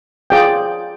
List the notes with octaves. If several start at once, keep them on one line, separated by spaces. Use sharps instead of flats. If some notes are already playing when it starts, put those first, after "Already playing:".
F4 G#4 D5 G5